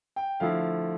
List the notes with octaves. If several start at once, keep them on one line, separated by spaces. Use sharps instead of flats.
G5
D3 F3 A3 E4 F5